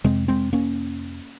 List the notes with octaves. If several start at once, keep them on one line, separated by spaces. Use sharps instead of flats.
F2 C3 G#3 C4
G#3 C4
A#3 C#4